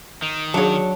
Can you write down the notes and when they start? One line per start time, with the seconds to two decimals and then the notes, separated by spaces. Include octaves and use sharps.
0.22 D#3
0.54 F#3 D4 G#4 C#5 F5 A5